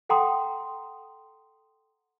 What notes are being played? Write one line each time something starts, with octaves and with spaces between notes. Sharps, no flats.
A4 F#5 G5 A#5 C6 D#6